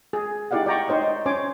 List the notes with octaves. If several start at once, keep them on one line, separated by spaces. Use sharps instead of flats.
G#4
D#4 E4 G4 D5 F5 F#5
D5 G5 A#5 C#6
D#4 C5 C#5 D#5
C#4 C5 C#5 G#5 C6 D6